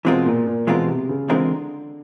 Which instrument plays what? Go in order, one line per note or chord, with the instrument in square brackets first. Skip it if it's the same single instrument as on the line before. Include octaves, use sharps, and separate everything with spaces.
[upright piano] B2 [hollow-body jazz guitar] E3 G#3 C4 F4 A#4
[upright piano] A#2
A#2
[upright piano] B2 [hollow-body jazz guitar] E3 G#3 C4 F4 A#4
[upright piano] C3
C#3
[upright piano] D3 [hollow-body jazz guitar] E3 G#3 C4 F4 A#4